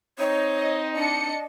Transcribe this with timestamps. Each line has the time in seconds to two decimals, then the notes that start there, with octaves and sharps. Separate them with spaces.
0.19 C4 D#4 C#5
0.55 D#5
0.96 D4 D#5 A5 C#7